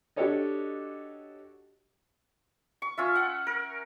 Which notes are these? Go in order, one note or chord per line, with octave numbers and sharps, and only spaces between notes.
D4 F#4 G4 A4 C#5 D#5
C#6
C#4 F4 E5
F#5
A#4